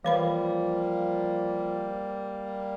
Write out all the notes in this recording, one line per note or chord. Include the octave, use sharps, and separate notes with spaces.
E3 F3 G3 A#3 B4 F5 B5